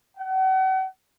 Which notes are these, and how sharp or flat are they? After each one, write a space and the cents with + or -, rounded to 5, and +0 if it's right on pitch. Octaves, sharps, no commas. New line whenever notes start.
F#5 +40